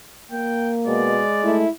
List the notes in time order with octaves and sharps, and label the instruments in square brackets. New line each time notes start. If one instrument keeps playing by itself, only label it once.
[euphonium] A#3 [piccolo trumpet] G5
[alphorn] B2 [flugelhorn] G#3 [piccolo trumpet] D5
[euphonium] A3 [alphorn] E4